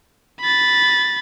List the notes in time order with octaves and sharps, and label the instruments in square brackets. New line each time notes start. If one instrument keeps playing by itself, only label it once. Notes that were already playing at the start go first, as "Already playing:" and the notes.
[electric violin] B5 A6